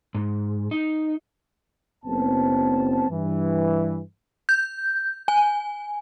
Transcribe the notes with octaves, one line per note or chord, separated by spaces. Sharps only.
G#2
D#4
F#1 B3 C4 A5
G2 E3
G6
G#5